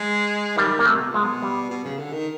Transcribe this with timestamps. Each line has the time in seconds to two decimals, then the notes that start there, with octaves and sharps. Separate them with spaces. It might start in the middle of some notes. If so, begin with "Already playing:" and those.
Already playing: G#3
0.57 D#3 G3
0.79 A#3
0.86 C3 A3
0.98 B2
1.10 A#2 G#3
1.22 B2
1.42 G3
1.71 B2
1.85 C#3
1.99 D3
2.13 D#3